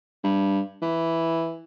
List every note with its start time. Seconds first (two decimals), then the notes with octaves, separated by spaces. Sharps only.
0.24 G2
0.82 E3